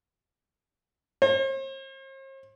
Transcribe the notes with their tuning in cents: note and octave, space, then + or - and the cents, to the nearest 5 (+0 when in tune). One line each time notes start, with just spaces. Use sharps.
C5 +45